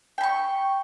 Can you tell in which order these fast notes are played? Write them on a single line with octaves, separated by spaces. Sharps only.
G5 B5 C#6